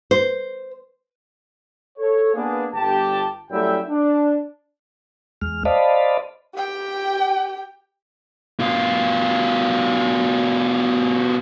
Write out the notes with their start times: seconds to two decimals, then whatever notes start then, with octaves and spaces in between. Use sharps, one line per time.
0.11 C5
1.98 A4 C#5
2.34 A#3 B3 D4 G#4
2.73 G1 G4 A5
3.50 F#2 G3 A3 E4 E5 G5
3.89 D4
5.42 E2 G#3 F6
5.65 C5 D5 D#5 F5 A5 B5
6.55 G4 G5
8.59 B2 F4